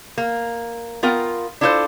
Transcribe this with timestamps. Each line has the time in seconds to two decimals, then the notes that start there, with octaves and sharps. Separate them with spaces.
0.18 A#3
1.03 B3 F4 A#4 F5 G5
1.61 D4 E4 F4 A4 A#4 C5